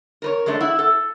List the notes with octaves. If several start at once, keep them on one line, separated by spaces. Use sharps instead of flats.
A#4 B4 C#5
F#3 G#3 A3 D4
E4 E5 F#5
A4